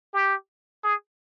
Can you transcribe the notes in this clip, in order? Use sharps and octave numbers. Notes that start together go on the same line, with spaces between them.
G4
G#4